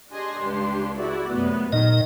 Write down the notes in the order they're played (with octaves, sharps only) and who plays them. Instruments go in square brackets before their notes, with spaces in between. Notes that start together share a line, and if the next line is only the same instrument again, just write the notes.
[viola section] D4 G4 C6 [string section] G#4 D#5 G#5
[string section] C#2 G2
[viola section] E4 F#4 D5 [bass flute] G#4
[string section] F#2 C3 [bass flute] A3 [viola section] B3
[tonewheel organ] A#2 D#5 [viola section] D#3 [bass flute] D#4